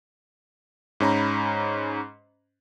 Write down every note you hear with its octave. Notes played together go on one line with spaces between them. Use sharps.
G#2 C#4 A#5 B5